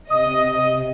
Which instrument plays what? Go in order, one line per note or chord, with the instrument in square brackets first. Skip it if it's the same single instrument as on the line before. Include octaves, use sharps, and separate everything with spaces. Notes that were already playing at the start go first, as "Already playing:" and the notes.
[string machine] C3 [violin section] D#5 [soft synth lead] D#6